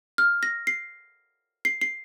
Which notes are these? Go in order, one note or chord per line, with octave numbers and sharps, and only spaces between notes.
F6
A#6
C7
C7
C7